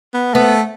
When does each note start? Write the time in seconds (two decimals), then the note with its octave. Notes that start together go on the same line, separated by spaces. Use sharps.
0.14 B3
0.34 A3 B3